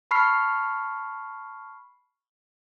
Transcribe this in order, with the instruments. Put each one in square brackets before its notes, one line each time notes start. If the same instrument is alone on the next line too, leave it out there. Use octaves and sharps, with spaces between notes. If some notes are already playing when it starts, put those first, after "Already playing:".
[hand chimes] A5 B5 C#6 F6 C7